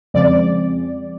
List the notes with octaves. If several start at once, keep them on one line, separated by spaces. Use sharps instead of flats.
F2 C#3 F3 G#3 C4 D5